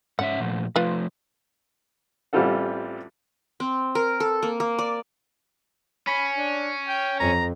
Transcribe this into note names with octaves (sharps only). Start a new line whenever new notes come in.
G#2 C#4 E5 F#5
A#2 F3 A3
F3 A3 F4 B4
A1 G3 C4 F4 A4 F#5
C4
A#4
A4
A#3
A#3
D5
C#4 B5
D4
G5
F2 A#5